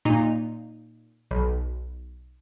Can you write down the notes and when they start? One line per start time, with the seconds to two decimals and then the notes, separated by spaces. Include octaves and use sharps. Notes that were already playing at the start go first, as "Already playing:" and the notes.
0.05 A#2 D#4
1.31 B1